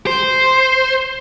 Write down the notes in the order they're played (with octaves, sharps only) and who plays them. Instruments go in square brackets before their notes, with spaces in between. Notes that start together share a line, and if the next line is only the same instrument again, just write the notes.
[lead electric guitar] C5